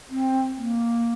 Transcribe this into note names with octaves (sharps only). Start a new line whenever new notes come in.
C4
A#3